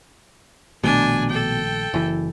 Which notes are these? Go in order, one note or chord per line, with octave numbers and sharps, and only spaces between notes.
A#1 B2 D#3 A3 D4 G#5
A4 G5
F#1 E3